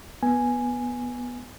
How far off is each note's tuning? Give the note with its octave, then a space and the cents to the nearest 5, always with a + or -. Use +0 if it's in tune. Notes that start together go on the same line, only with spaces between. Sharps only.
B3 -10 G#5 +0